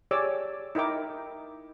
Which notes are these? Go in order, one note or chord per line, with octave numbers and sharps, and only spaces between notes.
G4 G#4 C#5 D5 D6 E6
D#4 E4 A#4 G5 D6